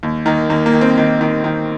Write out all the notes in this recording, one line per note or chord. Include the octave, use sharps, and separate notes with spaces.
D#2
D#3 A#3
D#2 A#3
A#3
D#3
C4
D#3
D#3
D#3